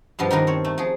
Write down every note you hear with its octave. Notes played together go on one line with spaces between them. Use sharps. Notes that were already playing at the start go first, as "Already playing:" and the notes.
G2 B2 F3 G3
D#3 A#3 D4 D#4 A#4 B4
C4 A4 C#5
A3
F3 G#4